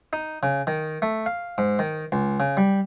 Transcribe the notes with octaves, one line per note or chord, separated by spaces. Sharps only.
D#4
C#3
D#3
A3
F5
G#2
D#3
C#2
C#3
G3